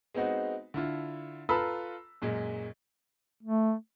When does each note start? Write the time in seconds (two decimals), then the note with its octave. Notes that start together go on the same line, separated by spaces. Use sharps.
0.14 G#3 B3 C4 D#4 F#4
0.74 D3 E4 F4
1.49 F4 A4 B4 A#5 B5 E6
2.22 F#2 A#2 G#3
3.43 A3